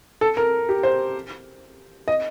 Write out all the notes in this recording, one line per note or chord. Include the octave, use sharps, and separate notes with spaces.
A4
A#4
G4
C5
D#5